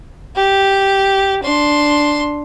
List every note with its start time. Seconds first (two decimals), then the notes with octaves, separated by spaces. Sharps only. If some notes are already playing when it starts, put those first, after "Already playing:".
0.37 G4
1.43 D4 C6